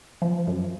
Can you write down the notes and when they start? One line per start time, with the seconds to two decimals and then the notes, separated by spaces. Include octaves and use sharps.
0.22 F3
0.47 F#2